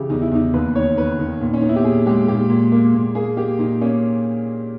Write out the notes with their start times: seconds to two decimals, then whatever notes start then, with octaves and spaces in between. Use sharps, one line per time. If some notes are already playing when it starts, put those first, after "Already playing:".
Already playing: C#3 E3 E4 G4
0.10 E2 D#4
0.22 E4
0.32 E2 D#4
0.53 D#2 B4
0.76 D#3 C#5
0.97 D#3 B4
1.19 D#3
1.41 A#2
1.53 C#4
1.61 B3 D#4
1.69 E4
1.76 G4
1.84 A#2 G#4
2.06 G#3 G4
2.28 A#2 G4
2.50 A#2
2.72 A#3
2.94 A#2
3.15 A#3 G#4
3.37 A#3 G4
3.59 A#2 D#4
3.81 A#3 C#4